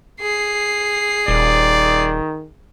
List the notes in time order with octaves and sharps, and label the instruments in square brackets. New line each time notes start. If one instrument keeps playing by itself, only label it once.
[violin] G#4 C7
[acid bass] D#1 [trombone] D#3 [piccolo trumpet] D5